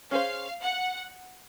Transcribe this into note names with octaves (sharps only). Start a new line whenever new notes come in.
C#4 G#4 C5 F5
F#5